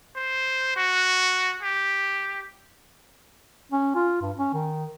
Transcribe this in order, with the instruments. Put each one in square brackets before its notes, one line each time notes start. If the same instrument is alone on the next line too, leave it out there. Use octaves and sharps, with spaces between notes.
[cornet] C5
F#4
G4
[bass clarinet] C#4
F4
G2
C#4
D#3